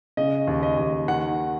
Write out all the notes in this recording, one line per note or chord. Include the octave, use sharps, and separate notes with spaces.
C#3 D#5
D#2
D#5
D#2
D#3 F#5